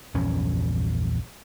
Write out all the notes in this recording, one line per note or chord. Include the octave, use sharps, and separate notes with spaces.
A#1 E2 G2 C#4